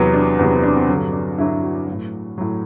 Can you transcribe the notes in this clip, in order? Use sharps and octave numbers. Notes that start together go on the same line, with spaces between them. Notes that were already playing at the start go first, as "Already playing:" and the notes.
Already playing: E2 C3 F#3 B3
D4
E2 C3 F#3 B3
C4
D4
C4
G2 D3 F#3
D4
G2 D3 F#3 E4
F#4
A2 F#3
A2 F#3